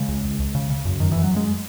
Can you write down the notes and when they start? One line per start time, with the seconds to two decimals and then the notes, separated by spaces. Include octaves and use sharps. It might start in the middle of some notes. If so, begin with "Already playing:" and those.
Already playing: C#3 G#3
0.08 C#2
0.24 C#2
0.40 C#2
0.55 C#3
0.70 C#3
0.85 F#2
1.00 F#2 D#3
1.12 F#2 E3
1.24 F#3
1.31 F#2
1.36 G#3